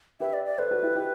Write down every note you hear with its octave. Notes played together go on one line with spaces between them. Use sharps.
G4 B4 E5
D5
D5
A4 B4 C5
F#4 A4
E4 G4
E4 G4